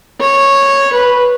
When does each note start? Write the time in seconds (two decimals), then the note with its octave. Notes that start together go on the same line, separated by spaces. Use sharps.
0.21 C#5
0.93 B4